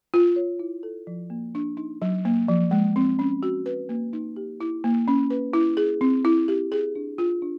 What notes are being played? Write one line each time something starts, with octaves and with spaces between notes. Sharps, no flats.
F4
C#5
E4
A4
F3
A#3
D4
D#4
F#3
A#3
F3
G#3
C4
C#4
F#4
B4
A#3
D#4
G4
E4
A#3
C#4
B4
E4
G#4
C4
E4
G4
G#4
D4
F4
D4